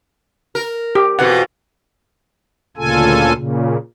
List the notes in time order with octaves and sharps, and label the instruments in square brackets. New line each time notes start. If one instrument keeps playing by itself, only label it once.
[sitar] A#4
[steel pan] G4
[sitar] F2 B2 E3 [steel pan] F#5
[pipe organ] D2 A#2 C#3 F4 A4 G#5
A#2 C#3